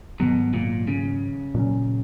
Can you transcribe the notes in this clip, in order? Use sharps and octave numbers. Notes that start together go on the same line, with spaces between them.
G#2 B2 D#3 F#3
A#2
C#3
A#2 F#3 C#4